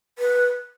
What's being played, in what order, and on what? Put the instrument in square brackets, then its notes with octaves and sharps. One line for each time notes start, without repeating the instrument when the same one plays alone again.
[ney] B4